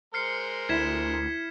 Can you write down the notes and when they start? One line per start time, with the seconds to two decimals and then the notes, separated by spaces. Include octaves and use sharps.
0.14 G#3 A#4 C5 F6 C7 C#7
0.69 D2 E4 G#6 B6 E7